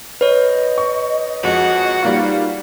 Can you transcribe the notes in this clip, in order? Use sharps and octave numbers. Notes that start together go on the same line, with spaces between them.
B4 C#5 D#5
C#6
F2 G#3 F#4
G3 A#3 D#4 F4